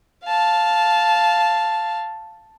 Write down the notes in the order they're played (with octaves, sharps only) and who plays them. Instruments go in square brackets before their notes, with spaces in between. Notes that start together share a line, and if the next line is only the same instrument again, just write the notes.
[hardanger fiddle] F5 A5